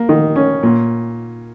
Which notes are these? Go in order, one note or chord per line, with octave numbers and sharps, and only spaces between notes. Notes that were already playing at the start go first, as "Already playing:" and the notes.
Already playing: A#3
D#3
C#4
A#2